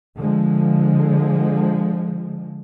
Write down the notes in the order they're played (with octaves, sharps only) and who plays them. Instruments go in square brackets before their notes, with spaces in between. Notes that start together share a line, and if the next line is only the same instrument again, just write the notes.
[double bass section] D3 F3 G#3